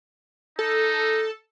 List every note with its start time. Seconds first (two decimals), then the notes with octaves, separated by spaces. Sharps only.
0.59 D#4 A4